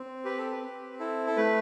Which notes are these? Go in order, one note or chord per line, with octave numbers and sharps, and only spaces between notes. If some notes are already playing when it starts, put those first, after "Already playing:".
Already playing: C4
G4 B4
A4
B4
C4
E4 A4
A4
A3 B4